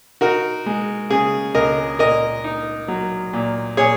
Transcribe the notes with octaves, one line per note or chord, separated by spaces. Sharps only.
D#4 F#4 A#4
G#3
C#3 G#4
C#2 A#4 D#5
A#2 A#4 D#5
D#4
F#3
A#2
A#2 G#4 C#5